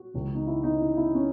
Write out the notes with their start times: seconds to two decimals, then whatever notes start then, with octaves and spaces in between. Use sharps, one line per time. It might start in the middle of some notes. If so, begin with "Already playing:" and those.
Already playing: F#4
0.14 C#2 C#3 E3
0.35 D#4
0.47 E4
0.63 D#4
0.80 E4
0.97 E4
1.14 C#4